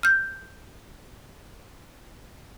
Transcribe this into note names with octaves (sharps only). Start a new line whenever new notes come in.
F6 G6